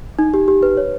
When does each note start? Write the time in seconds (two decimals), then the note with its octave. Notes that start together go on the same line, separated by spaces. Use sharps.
0.19 D#4
0.34 G4
0.48 G4
0.63 B4
0.77 C#5